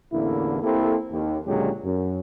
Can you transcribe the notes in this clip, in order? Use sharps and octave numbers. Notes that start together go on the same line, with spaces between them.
A1 E2 D3 A#3 E4
A#3 C4 E4 G4 A4
D#2
C#2 A#2 D3 F#3 G#3 G4
F#2